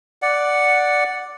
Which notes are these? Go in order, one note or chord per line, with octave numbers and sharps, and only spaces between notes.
D5 F#5